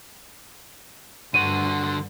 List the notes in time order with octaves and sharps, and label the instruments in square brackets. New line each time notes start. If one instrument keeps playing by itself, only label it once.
[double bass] G2 [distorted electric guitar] D3 F#4 [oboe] C6 [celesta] D#7